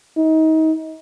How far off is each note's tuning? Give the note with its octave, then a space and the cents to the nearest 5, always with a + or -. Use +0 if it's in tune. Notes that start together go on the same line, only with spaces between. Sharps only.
D#4 +30